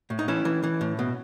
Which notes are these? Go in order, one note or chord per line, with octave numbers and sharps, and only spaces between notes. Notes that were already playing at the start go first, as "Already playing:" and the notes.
A2
D#4
E3 C#4 E4
E3
E3
A2
B2